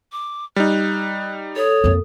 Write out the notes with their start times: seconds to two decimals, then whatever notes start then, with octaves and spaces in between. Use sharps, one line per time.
0.12 D6
0.56 G3 D#4 F#6
1.56 A4 C#5 D#6
1.84 F2 A#3